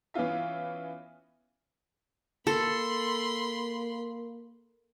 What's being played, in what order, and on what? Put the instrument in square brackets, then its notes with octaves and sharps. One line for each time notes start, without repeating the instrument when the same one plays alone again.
[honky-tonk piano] E3 B3 C#4 F4 E5
[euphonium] A#3 [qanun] A4 [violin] B5 C6